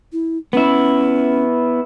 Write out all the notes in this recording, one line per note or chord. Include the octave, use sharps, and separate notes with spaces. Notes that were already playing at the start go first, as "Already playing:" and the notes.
E4
B3 C#4 E4